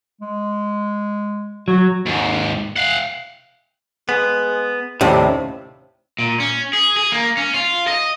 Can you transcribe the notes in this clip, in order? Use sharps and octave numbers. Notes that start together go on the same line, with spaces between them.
G#3
F#3 F#4
D#2 G#2
F5 F#5
G#3 B3
D#2 A2 C3 G3 C#4 C#5 A5
A#2
C#4
G#4
G#4
A#3
C#4
F4
D#5